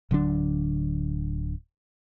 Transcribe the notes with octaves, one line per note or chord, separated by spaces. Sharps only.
D1 D3 F#3 D4